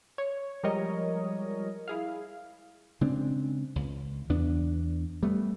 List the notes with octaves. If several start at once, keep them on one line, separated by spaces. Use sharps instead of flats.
C#5
F3 G3 G#3 A#4 C#5 D#5
E4 G#4 F5
C#3 G#3 C4 D4
C#2
E2 B3 D4
G3 A3 B3